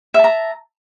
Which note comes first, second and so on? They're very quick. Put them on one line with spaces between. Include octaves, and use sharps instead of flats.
E5 A5 A#5